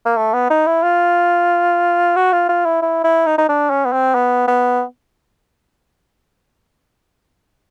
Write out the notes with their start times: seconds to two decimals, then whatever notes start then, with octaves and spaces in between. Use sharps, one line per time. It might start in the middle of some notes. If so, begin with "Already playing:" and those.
0.06 A#3
0.17 A3
0.33 B3
0.50 D#4
0.67 E4
0.83 F4
2.16 F#4
2.33 F4
2.49 F4
2.65 E4
2.82 E4
3.04 E4
3.26 D#4
3.38 D#4
3.49 D4
3.70 C#4
3.85 B3
3.93 C4
4.15 B3
4.48 B3